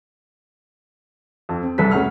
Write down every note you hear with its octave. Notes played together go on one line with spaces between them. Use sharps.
F2
C4
C2 A4 B4 G#5 B6
E1 A3 C#4 G#4 F#5 F6